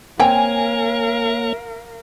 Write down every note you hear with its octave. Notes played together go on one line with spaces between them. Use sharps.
A#3 C4 A#4 C#5 F5 G5 G#5